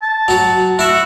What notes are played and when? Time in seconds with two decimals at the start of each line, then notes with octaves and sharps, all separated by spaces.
0.02 A5
0.28 F#3 F#4
0.79 E4 F#4 E5